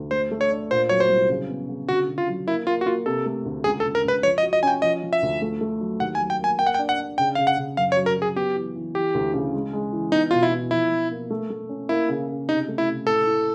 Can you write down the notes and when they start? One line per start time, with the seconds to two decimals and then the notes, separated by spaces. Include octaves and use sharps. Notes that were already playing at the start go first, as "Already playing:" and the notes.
Already playing: D2
0.11 A3 C5
0.31 A3
0.41 C#5
0.51 D4
0.70 A#2 C5
0.89 F#3 C#5
1.00 C5
1.09 C2
1.29 C#3
1.49 B3
1.68 C#3
1.88 D3 F#4
2.08 D3
2.18 F4
2.28 F#3
2.47 A#3 E4
2.67 A#3 F4
2.81 F#4
2.86 A#3 F4
3.06 C3 A4
3.26 A3
3.45 D2
3.64 C#2 G#4
3.80 A4
3.84 C#2
3.95 A#4
4.04 C#2 B4
4.23 F3 C#5
4.38 D#5
4.43 F#4
4.53 D#5
4.63 C#4 G5 G#5
4.82 F3 D#5
5.03 F3
5.13 E5
5.22 D2
5.42 A3
5.61 A3
5.81 F#3
6.00 D#2 F#5
6.15 G#5
6.20 F#3
6.30 G5
6.40 A#3 G#5
6.59 A#3 G5
6.67 F#5
6.74 G5
6.79 D4
6.89 F#5
6.98 D4
7.18 C#3 G5
7.35 C#3 F5
7.47 F#5
7.57 C#3
7.77 F#2 F5
7.92 C#5
7.97 F#3
8.06 A#4
8.17 F#3
8.22 G#4
8.36 B3 G4
8.56 E3
8.75 E3
8.94 E3 G4
9.14 D2
9.34 C#3
9.54 G#3
9.73 G#3
9.93 E3
10.12 B3 D#4
10.31 B2 F4
10.43 E4
10.52 B3
10.71 F3 E4
10.91 F3
11.11 A#3
11.30 A3
11.50 A3
11.69 C#4
11.89 A#3 E4
12.09 C#3
12.28 C#3
12.48 C3 D#4
12.68 A3
12.78 E4
12.87 C3
13.07 A2 A4
13.27 A2